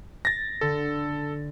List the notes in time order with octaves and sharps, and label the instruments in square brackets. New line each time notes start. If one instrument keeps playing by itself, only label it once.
[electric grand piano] A6 A#6
[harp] D3 [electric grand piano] A4